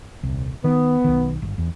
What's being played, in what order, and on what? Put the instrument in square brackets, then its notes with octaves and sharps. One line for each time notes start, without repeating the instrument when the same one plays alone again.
[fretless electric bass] D#1 C2
[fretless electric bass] D#3 [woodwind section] B3
[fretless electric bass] B1 D#3
G1
E2